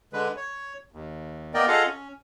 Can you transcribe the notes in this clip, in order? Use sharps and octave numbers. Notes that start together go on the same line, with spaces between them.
D3 G#3 B4
C#5
D#2
A#3 B3 A#4 D5 D#5 G5
F4 G#4 A4 D#5 F5 F#5
C#4